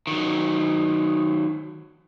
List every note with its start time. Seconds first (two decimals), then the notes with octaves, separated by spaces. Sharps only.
0.07 D#3 F#3